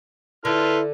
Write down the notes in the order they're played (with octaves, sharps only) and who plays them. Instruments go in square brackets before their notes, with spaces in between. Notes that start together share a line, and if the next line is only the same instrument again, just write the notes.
[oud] D3 [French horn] E4 [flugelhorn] A4 [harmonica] B4 C6 F6